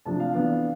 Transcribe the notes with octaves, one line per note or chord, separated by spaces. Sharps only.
C3 F3 A3 D4 A5
F5
E3 B3 D4